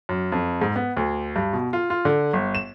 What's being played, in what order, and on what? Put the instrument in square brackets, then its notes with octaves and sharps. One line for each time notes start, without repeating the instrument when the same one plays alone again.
[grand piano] F#2
F2
G#2
B3
D2
G2
B2
F4
F4
D3
G1
E7